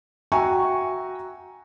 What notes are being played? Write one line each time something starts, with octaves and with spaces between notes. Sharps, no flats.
F#4 E5 G5 G#5 A#5 C#6